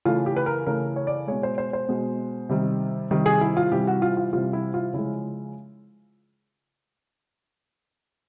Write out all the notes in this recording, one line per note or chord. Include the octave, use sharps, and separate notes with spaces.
C#3 E3 A3 F4
G4
B4
A#4
C#3 E3 A3 A#4
C#5
D5
B2 G#3 C#5
C5
C5
C5
B2 G#3
C3 D#3 G3
C3 D#3 G3
G#4
E4
F4
C3 E3 G3 G4
F#4
F4
F4
C3 E3 G3 F4
E4
F4
C#3 F3 G#3 E4